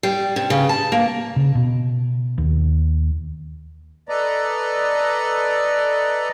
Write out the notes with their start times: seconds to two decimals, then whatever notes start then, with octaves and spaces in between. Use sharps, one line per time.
0.03 G3
0.36 C3
0.50 C#3
0.69 A5
0.92 A#3
1.36 C#3
1.55 B2
2.38 D#2
4.09 A4 B4 D5 D#5 A#5